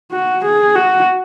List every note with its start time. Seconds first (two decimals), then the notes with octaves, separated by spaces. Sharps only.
0.12 F#4
0.44 G#4
0.76 F#4